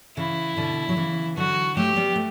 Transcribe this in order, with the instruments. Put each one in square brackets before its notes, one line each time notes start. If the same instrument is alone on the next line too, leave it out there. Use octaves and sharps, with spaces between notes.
[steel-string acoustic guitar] C#3 E3 [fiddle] E4
[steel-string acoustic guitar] B2 D3
F#3
C#3 E3
[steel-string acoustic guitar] D3 F#3 [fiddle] F#4
[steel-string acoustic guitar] F#3 A3 [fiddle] G4
[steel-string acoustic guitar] G3 B3
A3